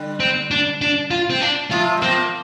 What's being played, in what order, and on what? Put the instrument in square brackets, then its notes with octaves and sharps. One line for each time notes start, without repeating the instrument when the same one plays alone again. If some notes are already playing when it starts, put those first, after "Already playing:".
Already playing: [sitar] D3 G3
[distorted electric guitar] C4
D4
D4
F4
C4
D4
[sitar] C3 F3 [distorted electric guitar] F4
[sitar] G3
[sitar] F3 A#3 [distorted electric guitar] C4